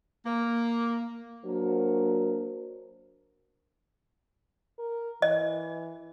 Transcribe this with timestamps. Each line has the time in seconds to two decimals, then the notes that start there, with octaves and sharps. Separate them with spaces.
0.24 A#3
1.44 F#3 A#3 D4 F#4 A#4 C5
4.79 A#4
5.22 E3 D#5